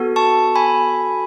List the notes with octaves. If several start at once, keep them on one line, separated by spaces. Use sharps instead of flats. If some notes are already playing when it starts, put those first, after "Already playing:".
Already playing: B3 F#4 A4
A5 C#6
G#5 B5